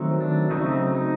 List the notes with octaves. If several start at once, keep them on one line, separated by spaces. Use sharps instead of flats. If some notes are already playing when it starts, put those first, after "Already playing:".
Already playing: D#3 F#3 A3 C4
D4
C#3 F#3 A3 C4 D#4
D#4